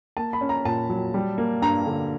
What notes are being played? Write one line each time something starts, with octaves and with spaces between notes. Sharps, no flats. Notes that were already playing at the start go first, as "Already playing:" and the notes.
A#3 A5
B5
C#4
A#5
A#2 A5
F#3
G3
A#3
G2 A#5
D3